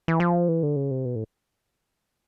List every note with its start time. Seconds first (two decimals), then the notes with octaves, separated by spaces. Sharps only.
0.08 E3
0.20 F3
0.48 E3
0.63 D3
0.76 C#3
0.91 C3
1.05 B2
1.15 A2